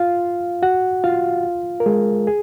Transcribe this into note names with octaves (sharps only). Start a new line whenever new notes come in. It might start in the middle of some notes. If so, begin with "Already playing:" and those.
Already playing: F4 F5
F#4 F#5
F4 F5
A#4
G#3 G#4
G#4